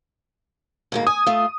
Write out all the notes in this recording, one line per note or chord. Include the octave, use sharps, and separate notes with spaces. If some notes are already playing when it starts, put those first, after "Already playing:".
D2 G#2 A#3
G#5 D#6
A3 F4